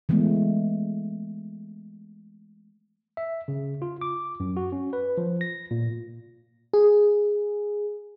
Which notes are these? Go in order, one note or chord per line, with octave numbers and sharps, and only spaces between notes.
E3 G#3 A3 B3
E5
C#3
F4
D6
F#2
F#4
C#4
B4
F3
A#6
A#2
G#4